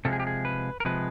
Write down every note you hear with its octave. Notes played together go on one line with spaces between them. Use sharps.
C3 F3 G#3 A4
G#4
G4
G#4
B4
A#4
C3 F3 G#3 B4